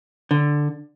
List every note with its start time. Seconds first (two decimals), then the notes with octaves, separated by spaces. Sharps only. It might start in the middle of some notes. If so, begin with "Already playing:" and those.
0.31 D3